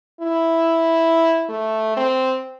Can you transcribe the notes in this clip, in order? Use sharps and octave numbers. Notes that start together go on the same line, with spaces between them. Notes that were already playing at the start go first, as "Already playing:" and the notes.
E4
A3
C4